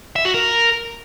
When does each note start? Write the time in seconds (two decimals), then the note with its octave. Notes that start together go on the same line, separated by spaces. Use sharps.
0.16 E5
0.25 F#4
0.34 A#4